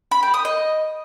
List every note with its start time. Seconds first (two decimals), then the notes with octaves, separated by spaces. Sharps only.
0.11 B5
0.23 G5
0.34 D#6
0.45 D#5